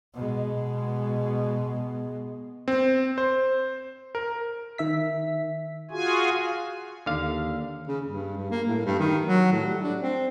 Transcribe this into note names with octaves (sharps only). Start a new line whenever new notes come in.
B2 G#3
C4
C5
A#4
D#3 E5 B6
F4 F#4 G#4 G#5
D#2 D3 F5
C#3
G2
G2
A#3
A2
G2
D#3
F#3
A2
G3
D4
C4